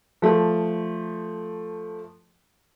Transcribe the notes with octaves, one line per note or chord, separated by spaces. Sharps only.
F3 A3